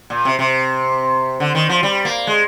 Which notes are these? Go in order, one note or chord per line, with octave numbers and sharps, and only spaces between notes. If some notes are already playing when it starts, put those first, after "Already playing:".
A#2
C3
C3
D3
D#3
F3
G3
A#3
G#3